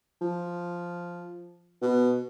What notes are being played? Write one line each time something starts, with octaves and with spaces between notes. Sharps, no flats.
F3
B2